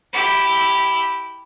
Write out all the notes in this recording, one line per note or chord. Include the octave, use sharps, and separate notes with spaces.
E4 G4